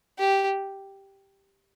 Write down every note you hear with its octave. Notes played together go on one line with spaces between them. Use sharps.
G4